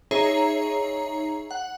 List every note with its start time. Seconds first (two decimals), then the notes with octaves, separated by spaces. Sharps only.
0.11 D#4 G#4 C#5 E5 A#5 C7
1.51 F#5